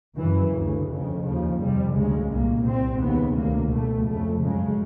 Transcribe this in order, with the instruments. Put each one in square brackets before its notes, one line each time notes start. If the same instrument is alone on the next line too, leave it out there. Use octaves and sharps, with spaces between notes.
[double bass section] F#2 C#3 E3
D2 C#3
F2 C#3
D#2 C#3 F3
F2 C3 G3
D2 C#3 G#3
C2 A#2 A#3
C2 A#2 C4
D#2 C#3 B3
D2 C3 A#3
C#2 B2 A3
F2 C#3 A3
F#2 C#3 G#3